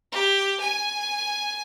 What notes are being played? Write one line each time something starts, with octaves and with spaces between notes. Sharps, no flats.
G4
G#5